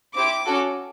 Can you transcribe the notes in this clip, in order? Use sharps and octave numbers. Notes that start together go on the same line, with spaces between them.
C4 E4 G4 D6
C#4 F#4 A4